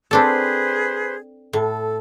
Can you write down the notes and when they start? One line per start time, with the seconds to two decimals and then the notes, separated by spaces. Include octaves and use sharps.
0.11 C4 D4 G#4 A4 B4 C5
1.53 A2 A4